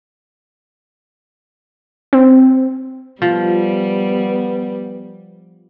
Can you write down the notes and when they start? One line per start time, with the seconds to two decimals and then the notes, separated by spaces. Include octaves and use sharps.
2.13 C4
3.22 F3 G3 B3